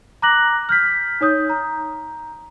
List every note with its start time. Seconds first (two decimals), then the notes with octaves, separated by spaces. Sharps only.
0.22 A#5 D6 F#6 A#6 F#7
0.69 F6 G6 B6
1.21 D#4 C#5 D#6 G6
1.50 A#5